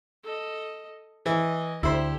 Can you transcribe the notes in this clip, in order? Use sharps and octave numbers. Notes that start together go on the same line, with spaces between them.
A4 D#5
E3 D#5
D2 E4 G4 A4 C5